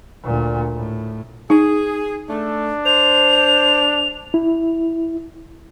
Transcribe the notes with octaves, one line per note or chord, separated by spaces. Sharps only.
D2 A#2
A2
D#4 G#4
A3 D4
C5 F7
E4